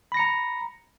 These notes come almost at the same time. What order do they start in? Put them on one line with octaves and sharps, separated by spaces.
B5 A#6 C#7 A#5